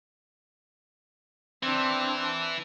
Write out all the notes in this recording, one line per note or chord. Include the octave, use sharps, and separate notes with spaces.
E3 C4 D4